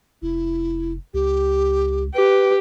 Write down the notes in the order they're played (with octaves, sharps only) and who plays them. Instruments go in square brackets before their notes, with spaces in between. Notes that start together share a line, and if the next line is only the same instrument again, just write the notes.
[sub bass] F1 [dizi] E4
[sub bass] C#2 [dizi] G4
[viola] G4 [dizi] B4